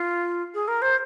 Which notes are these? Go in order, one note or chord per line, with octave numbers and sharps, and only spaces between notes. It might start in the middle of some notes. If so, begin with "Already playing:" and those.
Already playing: F4
G#4
A#4
C5